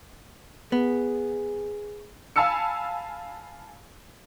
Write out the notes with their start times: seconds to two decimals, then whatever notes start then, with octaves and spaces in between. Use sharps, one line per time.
0.72 B3 G#4
2.36 F5 G#5 A5 B5 E6 C#7